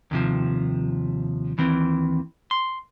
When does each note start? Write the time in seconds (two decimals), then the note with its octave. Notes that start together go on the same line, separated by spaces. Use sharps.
0.11 D#2 C3 F3
1.58 D#2 E3 C4
2.51 C6